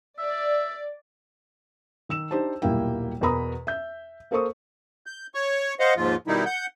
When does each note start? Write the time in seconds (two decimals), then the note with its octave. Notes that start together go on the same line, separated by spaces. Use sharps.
0.18 D5 E5
2.09 D#3 E6 E7
2.31 D4 D#4 G4 C5 G5 A5
2.62 D#1 B1 G3 A#3 E4 G5
3.21 E2 B2 A#4 A#5 B5 D#6
3.67 E5 G6
4.31 A#3 A4 A#4 C5 C#6 D#6
5.06 G6
5.34 C#5 C#6
5.80 C5 D#5 F5 F#5
5.97 D#2 G#2 F3 F4
6.27 B2 D#3 G3 D#4 E4
6.46 F#5 G6